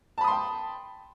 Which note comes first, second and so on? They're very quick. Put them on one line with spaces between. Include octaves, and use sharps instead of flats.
A5 B5 D#6 C6 G5